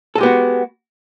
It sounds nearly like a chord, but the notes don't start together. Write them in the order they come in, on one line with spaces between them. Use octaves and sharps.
A4 G#3 G4 B3 F#4